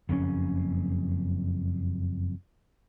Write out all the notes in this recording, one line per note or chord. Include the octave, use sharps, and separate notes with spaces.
F#1 F2 G#2 C#4